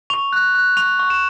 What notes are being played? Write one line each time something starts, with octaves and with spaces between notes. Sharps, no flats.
C#6 F7
F#6
F#6
C#6 F7
C#6
E7